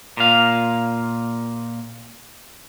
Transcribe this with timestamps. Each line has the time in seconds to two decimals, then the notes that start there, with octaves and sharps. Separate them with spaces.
0.17 A#2 F5